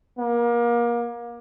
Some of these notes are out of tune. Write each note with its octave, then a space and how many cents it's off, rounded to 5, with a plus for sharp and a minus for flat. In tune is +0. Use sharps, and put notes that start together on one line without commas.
A#3 +30